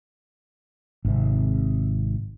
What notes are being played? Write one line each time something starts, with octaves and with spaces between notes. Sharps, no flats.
G#1 C3